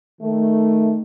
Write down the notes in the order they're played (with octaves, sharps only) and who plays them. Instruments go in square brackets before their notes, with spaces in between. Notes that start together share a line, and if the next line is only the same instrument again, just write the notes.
[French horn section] D#3 A3